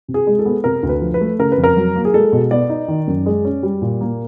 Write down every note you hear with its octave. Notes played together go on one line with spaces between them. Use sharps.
C3
G#4
G#3
A4
B3
C3 A#4
D2
B4
F3
B4
A3
C#3 A#4
B4
F2
A#4
F#3
A#3
G#4
G#3 A4
B2
B3 D5
D#4
D#3
F#2
G#3
C#4
G3
A#2
A#3